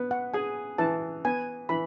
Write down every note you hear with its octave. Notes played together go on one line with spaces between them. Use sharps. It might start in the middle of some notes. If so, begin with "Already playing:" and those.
Already playing: B3
F#5
G#4 G#5
E3 A5
B3 G#5
E3 B5